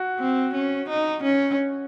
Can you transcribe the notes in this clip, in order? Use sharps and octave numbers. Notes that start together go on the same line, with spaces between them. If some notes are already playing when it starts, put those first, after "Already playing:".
Already playing: F#4
C4
C#4
D#4
C#4